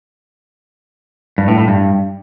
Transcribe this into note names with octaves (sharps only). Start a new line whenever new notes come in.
G2
A2
A2
G2